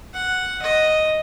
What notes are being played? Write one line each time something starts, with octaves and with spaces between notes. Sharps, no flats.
F#5
D#5